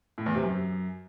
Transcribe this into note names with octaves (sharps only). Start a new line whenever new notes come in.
A2
E2
C3
F#2